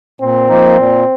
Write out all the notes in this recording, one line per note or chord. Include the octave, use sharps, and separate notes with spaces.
A#2 C4
F3 A#3 D#4
A#2